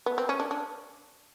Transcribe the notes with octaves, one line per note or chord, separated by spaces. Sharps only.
B3
C4
C#4
D4
D4